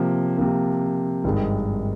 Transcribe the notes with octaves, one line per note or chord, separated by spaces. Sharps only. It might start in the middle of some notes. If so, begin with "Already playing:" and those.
Already playing: C3 F3 A#3
C3 F3 A#3
G#1 G2 D#3 G#3